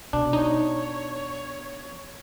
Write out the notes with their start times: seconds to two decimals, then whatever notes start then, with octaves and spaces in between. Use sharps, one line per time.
0.13 B2 D4
0.33 D#4 C#5